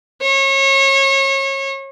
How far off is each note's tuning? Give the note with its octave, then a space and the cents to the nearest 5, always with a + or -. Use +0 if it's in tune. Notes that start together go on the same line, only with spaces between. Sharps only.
C#5 -30